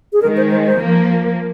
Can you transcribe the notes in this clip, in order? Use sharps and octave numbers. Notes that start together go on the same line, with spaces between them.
G#4
D#3 G#3 A#4
C5
C5
C5
F3 A#3